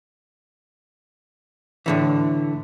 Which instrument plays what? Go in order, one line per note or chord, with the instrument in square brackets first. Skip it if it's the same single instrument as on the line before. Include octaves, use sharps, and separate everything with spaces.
[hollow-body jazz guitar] A2 D3 E3